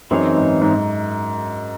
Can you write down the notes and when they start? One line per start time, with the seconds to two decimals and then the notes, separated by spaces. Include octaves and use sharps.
0.11 F#2 E3 C4 D#4 G#4 C#5
0.36 G#2
0.61 G#2